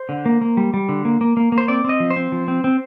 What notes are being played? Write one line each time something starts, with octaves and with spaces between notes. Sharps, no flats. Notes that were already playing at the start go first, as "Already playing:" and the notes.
Already playing: C5
D3
A#3
A#3
G3
G3
D3
A#3
A#3
A#3
A#3
C5
C4 D5
C4 D#5
F3
C5
C4
F3
C4
C4